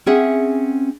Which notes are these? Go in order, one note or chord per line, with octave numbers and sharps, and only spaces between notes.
C4 C#4 G#4 E5 F#5